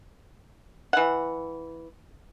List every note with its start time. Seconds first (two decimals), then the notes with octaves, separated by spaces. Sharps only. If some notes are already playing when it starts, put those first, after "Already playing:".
0.93 E3 F#5